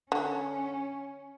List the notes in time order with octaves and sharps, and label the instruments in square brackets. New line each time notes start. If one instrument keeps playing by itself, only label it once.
[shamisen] D3 [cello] C#4